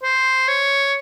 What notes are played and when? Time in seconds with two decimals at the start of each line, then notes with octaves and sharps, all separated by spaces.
0.03 C5
0.48 C#5